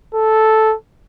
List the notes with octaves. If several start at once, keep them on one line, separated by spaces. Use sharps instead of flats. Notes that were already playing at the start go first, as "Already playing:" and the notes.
A4